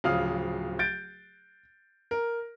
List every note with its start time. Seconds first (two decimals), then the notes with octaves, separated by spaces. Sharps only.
0.04 D1 C#3 F3 F5 D#6 F6
0.79 G6 A6 D7
2.11 A#4